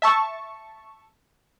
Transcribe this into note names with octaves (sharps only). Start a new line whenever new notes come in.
E5 A5 C#6